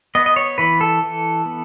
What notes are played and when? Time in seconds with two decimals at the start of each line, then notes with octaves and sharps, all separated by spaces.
0.15 B3 D#5
0.26 D#5
0.36 C#5
0.58 E3 B4
0.81 A4
1.03 E3
1.46 B3